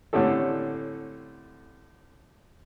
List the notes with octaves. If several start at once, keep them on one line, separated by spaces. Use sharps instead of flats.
A2 D3 C4 C#4 G4 A4